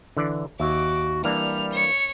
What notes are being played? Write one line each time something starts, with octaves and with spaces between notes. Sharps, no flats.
D3 E3 D5
D#2 F#4 E5 D6
E3 G3 A#3 D4 F6
C#5 C#7